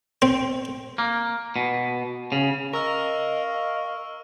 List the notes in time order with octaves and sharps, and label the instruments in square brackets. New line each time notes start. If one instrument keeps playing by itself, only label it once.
[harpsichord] C4
[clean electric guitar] A#3
B2
C#3
[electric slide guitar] A#4 [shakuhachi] D#5 [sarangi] F5 [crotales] C#6 E6 F6